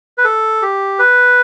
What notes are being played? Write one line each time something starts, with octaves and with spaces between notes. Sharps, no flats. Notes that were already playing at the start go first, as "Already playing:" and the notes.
B4
A4
G4
B4